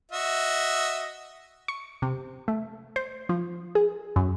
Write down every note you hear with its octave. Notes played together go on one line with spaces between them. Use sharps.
F#4 D#5 E5
C#6
C3
A3
C5
F3
G#4
F#2